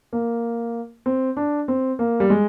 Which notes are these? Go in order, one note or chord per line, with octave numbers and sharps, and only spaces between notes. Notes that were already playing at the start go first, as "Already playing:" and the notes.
A#3
C4
D4
C4
A#3
G3
G#3